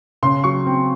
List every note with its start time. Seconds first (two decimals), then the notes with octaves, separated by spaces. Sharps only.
0.23 C#3 C6
0.44 F#3 C#6
0.66 C4